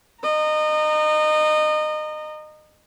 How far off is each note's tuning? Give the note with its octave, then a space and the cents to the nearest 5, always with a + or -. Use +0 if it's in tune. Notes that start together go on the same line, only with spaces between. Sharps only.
D#5 -25 A#5 -15